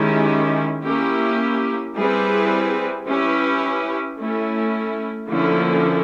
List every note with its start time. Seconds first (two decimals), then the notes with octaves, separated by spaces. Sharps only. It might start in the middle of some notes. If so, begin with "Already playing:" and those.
Already playing: D#3 G#3 C#4 E4 G4
0.85 A#3 C#4 E4 G4
1.96 G3 C4 E4 G#4 B4
3.07 C#4 E4 G4 B4
4.17 A3 C#4 E4
5.29 D3 F3 A#3 C#4 E4